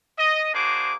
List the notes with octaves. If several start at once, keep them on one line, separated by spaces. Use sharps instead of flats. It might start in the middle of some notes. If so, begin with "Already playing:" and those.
D#5
A#3 D4 F#4 G#4 C5 D6